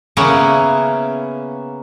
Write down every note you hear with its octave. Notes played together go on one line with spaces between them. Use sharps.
C#3 A#3 B3 C#4 E4